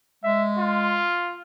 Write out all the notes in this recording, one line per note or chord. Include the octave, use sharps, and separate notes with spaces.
G#3 E5
F4